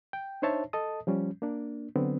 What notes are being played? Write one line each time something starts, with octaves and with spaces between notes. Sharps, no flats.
G5
D4 D#4 C5 C#5 E5 A5
A4 D#5 A5 D#6
F3 G3 C#4
A#3 D4
D3 F#3 B3 C4